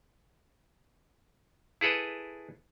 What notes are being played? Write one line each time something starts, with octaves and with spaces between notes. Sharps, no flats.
E4 G#4 A4 B4